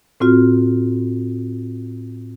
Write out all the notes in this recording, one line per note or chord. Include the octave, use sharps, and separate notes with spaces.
A2 C4 F4 F#4 F6